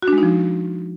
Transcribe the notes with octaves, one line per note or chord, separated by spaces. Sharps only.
F#4
D4
G#3
D#4
F3